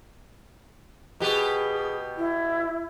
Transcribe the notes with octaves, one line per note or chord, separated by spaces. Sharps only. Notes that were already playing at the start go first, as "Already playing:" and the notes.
B2 G4 G#4 B4
E4